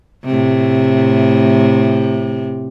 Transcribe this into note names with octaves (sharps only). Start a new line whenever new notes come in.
A2 C3